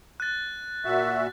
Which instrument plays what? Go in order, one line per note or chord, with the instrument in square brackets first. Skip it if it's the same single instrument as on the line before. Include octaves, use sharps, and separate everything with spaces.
[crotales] F#6 A6
[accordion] A#2 F#4 E5